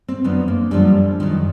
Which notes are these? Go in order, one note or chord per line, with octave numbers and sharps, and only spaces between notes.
C4
F#2 D3 F3 B3
A#3
F#2 D3 F3 G3
F#2 D#3 F3